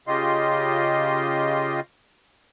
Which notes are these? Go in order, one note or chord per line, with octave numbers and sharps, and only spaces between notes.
C#3 F4 G4 D#5 C6